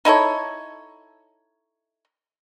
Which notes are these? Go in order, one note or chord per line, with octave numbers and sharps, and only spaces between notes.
D#4 E4 A4 C#5